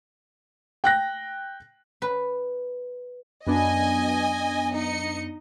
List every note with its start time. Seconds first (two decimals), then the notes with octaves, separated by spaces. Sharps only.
0.84 G5 F#6 A#6
2.02 B4
3.47 F#2 B3 D4 D#5 G#5
4.74 D#4 D#5 C#7